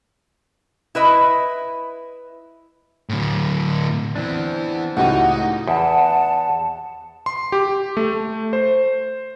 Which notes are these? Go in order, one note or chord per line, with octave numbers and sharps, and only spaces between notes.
E4 B4 D#5
A2 D3
E3 B3 C4 D4
C#2 A2 D#4 F#4 G4 F#5
E2 F#5 A5
C6
G4
A3
C5